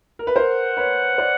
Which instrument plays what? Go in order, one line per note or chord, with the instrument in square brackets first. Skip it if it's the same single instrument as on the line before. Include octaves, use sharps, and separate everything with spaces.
[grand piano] A#4
B4
[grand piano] A#4 C5 [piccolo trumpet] F#5
[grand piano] B4 C#5
C5 D5